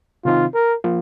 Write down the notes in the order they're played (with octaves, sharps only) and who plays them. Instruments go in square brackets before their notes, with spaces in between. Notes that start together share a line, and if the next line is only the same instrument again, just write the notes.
[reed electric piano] C3 D#3 C4 D#4 [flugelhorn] F4
[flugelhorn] A#4
[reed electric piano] F3 A#3 F4